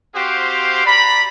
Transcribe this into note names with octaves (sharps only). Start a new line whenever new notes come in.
C4 F#4 G4 C5 F5
D5 A#5 B5